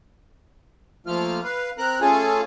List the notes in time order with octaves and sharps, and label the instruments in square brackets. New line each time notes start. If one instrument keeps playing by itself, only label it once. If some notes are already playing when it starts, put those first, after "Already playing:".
[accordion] F3 A3 A#3 F4 F6
B4 F5
C4 A#4 A#5 F#6
A3 C#4 F4 G#4 A4 G#5